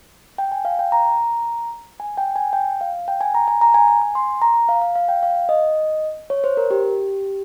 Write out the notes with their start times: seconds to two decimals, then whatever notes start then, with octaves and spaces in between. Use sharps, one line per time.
0.38 G5
0.52 G#5
0.65 F5
0.79 G5
0.92 A#5
2.00 G#5
2.18 G5
2.36 G#5
2.53 G5
2.81 F5
3.08 G5
3.21 G#5
3.35 A#5
3.48 G#5
3.61 A#5
3.74 G#5
3.88 G#5
4.02 G#5
4.15 C6
4.42 A#5
4.69 F5
4.81 F5
4.95 F5
5.08 G5
5.23 F5
5.49 D#5
6.30 C#5
6.44 C5
6.57 A#4
6.71 G4